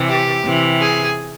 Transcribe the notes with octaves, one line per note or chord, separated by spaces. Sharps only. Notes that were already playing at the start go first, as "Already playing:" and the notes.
Already playing: C3 E3
G4
C3 E3
G#4